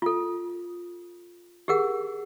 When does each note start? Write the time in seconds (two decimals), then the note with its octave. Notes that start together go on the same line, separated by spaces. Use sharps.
0.02 F4 A4
1.68 G4 G#4 A#4 F#5